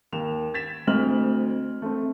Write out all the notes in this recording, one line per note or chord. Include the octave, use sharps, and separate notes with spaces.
D#2 E7 F7
G#6 A6 B6 E7
D2 C4 D#5 F6 F#7
A3 C4